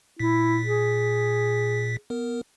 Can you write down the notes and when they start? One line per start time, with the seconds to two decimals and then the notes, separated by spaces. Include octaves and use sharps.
0.19 A#2 E4 B6
0.65 G#4
2.10 B3 A#4